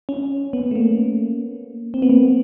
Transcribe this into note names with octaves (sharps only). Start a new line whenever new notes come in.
C#4
B3
A3
A#3
C4
B3
A#3